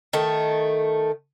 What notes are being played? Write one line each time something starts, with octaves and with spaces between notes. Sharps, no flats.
D#3 A3